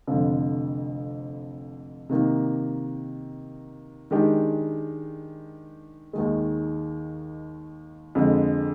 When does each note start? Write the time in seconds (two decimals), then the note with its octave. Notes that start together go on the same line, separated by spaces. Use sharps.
0.07 F1 F2 D3 F3
2.09 C3 D#3 A#3
4.11 D#3 G#3 D4 G4
6.13 D#2 D#3 G#3
8.15 F2 D3 G#3